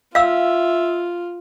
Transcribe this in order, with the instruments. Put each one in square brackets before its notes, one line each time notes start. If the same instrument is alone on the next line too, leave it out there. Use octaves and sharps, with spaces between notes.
[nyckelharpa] F4 [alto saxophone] E5 [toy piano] F5 E6